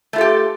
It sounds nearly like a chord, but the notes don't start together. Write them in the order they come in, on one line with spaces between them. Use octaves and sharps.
A3 F4 A4 G4